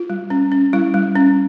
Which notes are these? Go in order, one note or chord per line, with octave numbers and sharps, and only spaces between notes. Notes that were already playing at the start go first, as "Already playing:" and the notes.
Already playing: F4
G3
C#4
C#4
G3 E4
G3
C#4